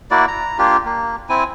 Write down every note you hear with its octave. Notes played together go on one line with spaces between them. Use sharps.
A#3 E4 F#4 D5
A#5
A#3 D4 F4 G4
A#3
C4 E4 G#5